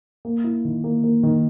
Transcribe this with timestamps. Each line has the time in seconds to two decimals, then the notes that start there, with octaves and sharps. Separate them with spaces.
0.25 A#3
0.44 E4
0.65 D#3
0.84 A#3
1.04 A#3
1.23 D#3